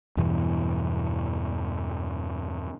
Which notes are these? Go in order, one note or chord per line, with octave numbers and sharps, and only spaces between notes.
E2 G2 B2 E3